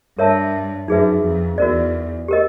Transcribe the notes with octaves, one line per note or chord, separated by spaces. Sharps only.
G2 A#4 C#5 E5 A5
F#2 D#4 G#4 B4 E5
F2
E2 F#4 A#4 D5
G4 A#4 D#5